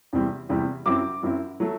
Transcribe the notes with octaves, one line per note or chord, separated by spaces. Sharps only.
E2 C3 E3 G3 C4
E2 C3 E3 G3 C4
F#2 F#3 C4 E4 D6
F#2 F#3 C4 E4
F#3 A3